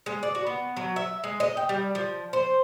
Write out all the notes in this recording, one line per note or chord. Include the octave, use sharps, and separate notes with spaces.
G#3
D5
F#4
B3
F#3
E5
G#3
D#5
G5
G3
F3
C5